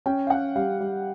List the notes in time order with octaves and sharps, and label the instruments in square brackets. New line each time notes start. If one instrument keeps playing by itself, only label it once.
[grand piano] C#4 [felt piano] G5
[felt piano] F5
[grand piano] C#4 [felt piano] F#5
[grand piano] G3 [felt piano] F5
[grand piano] G3